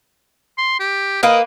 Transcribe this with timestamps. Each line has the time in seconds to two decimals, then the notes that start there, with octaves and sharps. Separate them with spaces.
0.58 C6
0.80 G4
1.23 A#3 B4 D#5